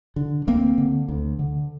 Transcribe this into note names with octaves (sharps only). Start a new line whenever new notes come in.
D3
D2 A#3 C4
D3
D2
D3